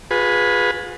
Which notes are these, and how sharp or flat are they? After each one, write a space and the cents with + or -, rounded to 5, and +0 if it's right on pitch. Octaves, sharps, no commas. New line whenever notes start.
F4 +40 G#4 +0 B4 +0